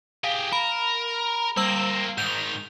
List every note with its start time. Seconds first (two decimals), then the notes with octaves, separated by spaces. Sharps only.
0.24 G4 G#4 F5
0.53 A#4 B5
1.57 G3 A#3 C4 E6 F#7
2.18 G#2 D#3 G6 F7